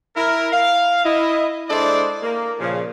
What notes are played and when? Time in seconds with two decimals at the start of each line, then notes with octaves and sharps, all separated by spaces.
0.16 E4 A#4
0.52 F5
1.04 E4 D#5
1.69 G#3 D4 E4 A4 C5 D5
2.22 A#3
2.59 A#2 C#3 F3